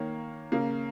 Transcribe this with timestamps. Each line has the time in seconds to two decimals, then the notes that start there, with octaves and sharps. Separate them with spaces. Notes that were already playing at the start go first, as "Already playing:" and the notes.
Already playing: D#3 A#3 C#5
0.52 C#3 A#3